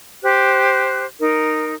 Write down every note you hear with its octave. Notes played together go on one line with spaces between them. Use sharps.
G4 C5 F#6
D#4 A#4